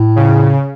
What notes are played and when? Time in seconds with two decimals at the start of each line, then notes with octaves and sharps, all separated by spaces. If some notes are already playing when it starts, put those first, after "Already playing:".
Already playing: A2
0.16 C#3